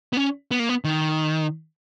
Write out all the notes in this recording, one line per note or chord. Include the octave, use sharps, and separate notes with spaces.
B3
C#4
B3
A#3
B3
D#3